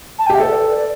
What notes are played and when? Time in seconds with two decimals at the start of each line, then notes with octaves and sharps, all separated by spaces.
0.19 A5
0.26 G5
0.30 G4
0.35 E5
0.40 A4 B4
0.50 D5
0.61 B4
0.72 D5